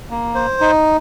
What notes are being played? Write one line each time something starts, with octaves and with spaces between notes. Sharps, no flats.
A#3
C5
D#4